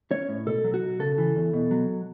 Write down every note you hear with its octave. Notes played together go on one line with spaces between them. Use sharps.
C#4 C#5
A2
B2 A4
F#3
F#4
B1
C#3 A4
E3
E2
B2
F#3